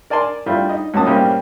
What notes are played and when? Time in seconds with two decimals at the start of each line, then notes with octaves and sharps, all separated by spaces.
0.10 A#4 D5 G#5 A5 C6
0.46 G3 A3 D4 E4 F4
0.69 D#4 D#5
0.94 C#2 F#3 A#3 A5 D#6
1.06 A2 C3 G3 A#3 C#4